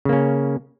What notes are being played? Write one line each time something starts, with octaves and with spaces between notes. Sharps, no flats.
C#3 A#3 C#4